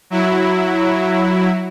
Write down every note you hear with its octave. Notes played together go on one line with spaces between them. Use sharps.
F#3 E4